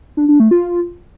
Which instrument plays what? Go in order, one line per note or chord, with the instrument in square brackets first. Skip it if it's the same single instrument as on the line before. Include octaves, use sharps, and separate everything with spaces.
[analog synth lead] D4
D4
A3
F4